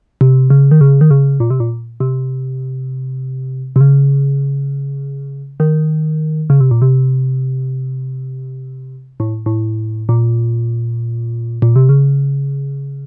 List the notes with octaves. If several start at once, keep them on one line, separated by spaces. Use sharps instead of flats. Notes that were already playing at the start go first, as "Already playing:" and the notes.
C3
C#3
D#3
C#3
D#3
C#3
A#2
C3
A#2
C3
C3
C#3
D#3
C#3
C3
A#2
C3
A2
A2
A#2
A#2
C3
C#3